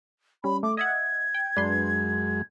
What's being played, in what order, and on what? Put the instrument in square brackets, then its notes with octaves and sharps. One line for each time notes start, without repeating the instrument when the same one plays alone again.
[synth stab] G3 C#4 [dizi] B5
[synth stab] A3 [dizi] D6
[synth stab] D#5 E5 F#5 [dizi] G#6
[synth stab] G5
[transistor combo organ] F#2 G#3 [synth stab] D4 B4 C6